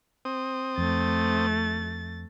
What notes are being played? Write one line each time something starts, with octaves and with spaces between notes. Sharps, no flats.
C4 D#6
F2 A3 A6